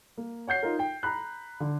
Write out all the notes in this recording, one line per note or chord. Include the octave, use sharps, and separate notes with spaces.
A#3
C#5 F#5 G6 C7
D#4 F4 A#4
G5
A#5 B5 F#6
D3